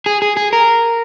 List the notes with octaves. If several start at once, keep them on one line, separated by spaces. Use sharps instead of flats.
G#4
G#4
G#4
A#4